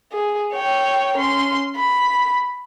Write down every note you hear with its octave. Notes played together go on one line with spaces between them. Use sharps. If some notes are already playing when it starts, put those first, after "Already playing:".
G#4
C#5 G5
C#4 C6
B5